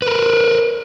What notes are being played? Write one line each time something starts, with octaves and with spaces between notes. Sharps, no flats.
A#4 B4